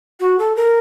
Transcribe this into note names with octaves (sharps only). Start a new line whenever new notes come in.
F#4
A4
A#4